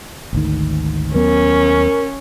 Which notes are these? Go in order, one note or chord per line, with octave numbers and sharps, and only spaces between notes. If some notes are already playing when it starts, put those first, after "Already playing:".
G#1 D2 D#3
D#2 F#3 B3 C#4 A#4